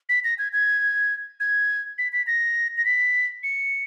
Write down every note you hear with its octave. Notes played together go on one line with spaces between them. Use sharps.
B6
A#6
G#6
G#6
G#6
B6
B6
A#6
A#6
B6
C#7